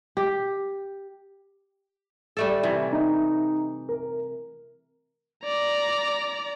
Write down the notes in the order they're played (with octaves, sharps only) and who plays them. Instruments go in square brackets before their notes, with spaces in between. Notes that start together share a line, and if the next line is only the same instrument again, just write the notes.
[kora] G4
G3 A3 A4
C3 E3
[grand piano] D#4
A#4
[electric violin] D5 A#5